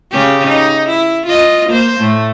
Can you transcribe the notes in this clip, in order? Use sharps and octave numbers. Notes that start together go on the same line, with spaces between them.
C#3 C#4 G4
D#4
E4
F4 D#5
A#3 C5
A2 A3